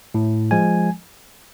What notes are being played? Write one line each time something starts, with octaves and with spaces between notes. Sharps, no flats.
A2
F3 G#3 G#5